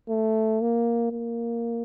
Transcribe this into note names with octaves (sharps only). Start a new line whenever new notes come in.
A3
A#3
A#3